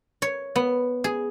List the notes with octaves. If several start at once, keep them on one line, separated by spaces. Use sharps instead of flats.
C#5
B3
G#4